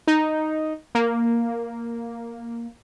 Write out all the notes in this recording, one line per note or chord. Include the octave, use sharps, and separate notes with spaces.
D#4
A#3